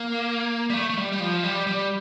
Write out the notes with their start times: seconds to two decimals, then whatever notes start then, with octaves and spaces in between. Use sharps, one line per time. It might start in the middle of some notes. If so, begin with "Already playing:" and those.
Already playing: A#3
0.70 G3
0.74 A3
0.90 A3
0.97 G3
1.12 G3
1.20 F3
1.44 G3
1.67 G3